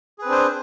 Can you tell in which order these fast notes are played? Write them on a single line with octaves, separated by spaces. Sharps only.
G#4 B4 C4 D4 C5